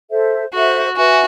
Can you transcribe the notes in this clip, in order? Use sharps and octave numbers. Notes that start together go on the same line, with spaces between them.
A4 C5 E5
F#4 A4 C5 E5
F#4 B4 E5 G#5